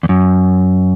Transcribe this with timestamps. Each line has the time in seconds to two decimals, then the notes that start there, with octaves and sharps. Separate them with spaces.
0.03 E2
0.09 F#2